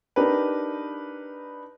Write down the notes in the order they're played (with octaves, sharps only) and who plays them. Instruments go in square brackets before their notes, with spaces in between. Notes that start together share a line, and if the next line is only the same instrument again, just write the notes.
[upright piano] D4 D#4 G4 A#4 B4